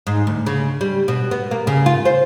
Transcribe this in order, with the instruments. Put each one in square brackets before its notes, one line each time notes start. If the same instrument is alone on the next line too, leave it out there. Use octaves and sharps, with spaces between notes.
[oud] G#2
D2
C#3
G3
B2
B3
A#3
C#3
F4
C5